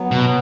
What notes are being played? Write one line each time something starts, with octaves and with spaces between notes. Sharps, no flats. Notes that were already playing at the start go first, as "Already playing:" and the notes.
Already playing: F#3 B3
B2